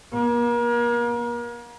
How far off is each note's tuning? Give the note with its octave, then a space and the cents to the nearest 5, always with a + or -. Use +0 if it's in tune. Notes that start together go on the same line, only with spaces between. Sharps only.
A#3 +35